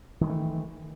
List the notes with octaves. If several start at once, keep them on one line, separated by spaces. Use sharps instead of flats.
D#3 E3 G#3 A3